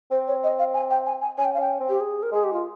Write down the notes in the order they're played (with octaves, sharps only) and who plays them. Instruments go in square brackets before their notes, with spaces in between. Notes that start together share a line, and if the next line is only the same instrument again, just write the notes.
[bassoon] C4 [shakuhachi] C5
[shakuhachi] C#5
D#5
F5
G#5
G5
G#5
G#5
[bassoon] C#4 [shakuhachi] G#5
[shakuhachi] G5
F5
[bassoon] C#4 [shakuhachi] G5
[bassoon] C4
[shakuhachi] G4
G#4
A#4
[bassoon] G#3 [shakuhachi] G#4
[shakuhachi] G4
F4